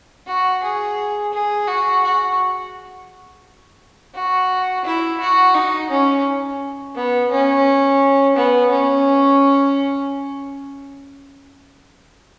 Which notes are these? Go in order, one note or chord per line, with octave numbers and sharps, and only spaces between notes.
F#4
G#4
G#4
F#4
F#4
F#4
E4
F#4
D#4
C#4
B3
C#4
B3
C#4